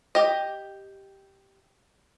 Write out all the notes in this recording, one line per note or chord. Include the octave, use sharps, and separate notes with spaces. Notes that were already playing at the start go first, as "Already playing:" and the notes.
G4 D#5